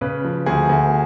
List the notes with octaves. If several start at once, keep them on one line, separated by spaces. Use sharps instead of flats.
C#3 B4
F3
D2 G#4
D2